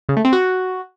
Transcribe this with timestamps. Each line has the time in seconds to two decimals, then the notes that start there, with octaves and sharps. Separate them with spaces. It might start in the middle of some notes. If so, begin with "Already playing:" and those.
0.09 C#3
0.17 A3
0.25 C4
0.33 F#4